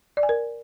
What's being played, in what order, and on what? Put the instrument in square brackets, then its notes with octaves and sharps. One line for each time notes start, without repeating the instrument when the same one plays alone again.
[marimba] D5
G#5
A#4